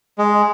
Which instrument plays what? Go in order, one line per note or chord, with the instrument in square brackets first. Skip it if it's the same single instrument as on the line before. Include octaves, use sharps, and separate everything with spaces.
[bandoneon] G#3